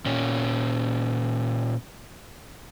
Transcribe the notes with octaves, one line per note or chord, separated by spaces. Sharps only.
A#2 C#4